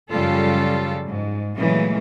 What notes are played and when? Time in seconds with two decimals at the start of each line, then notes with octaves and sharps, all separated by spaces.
0.10 F#2 C#3 F3 G3 F4 A4
1.06 G#2
1.58 A#2 C#3 E3 F#3 G#3 A3